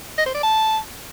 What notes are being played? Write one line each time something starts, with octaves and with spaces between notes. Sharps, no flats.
D#5
C5
D5
A5